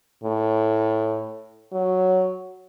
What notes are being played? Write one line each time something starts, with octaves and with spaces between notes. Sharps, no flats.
A2
F#3